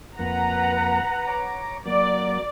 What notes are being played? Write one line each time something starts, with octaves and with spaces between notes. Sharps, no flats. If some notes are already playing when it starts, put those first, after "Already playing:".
F2 A#3 B4 F#5 A#5
C#5 A#5 D6
F#3 A#3 D5